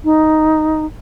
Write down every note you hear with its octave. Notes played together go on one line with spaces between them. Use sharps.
D#4